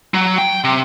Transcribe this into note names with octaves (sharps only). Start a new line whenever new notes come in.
F#3
G5
C3